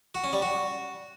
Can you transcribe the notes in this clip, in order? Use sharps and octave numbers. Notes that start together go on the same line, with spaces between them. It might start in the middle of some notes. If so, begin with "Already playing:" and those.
F#4
C#4
G3
F#4